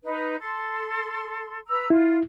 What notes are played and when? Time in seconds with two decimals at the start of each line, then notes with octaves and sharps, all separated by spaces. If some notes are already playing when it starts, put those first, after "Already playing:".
0.03 D#4 B4
0.39 A4 C6
1.67 B4 A#5 E6
1.90 E4 F4